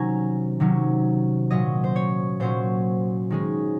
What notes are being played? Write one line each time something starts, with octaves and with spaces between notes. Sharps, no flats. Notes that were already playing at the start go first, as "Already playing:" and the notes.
Already playing: C3 D#3 F#3 C#4 G#5 A#5
C3 D#3 F#3 C#4
A#2 F#3 C#4 D#5
C5
C#5
A#2 F#3 C#4 C5
D#3 G#3 C#4